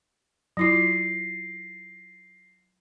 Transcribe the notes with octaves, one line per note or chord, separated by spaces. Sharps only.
F#3 E4 F4 A#6 C7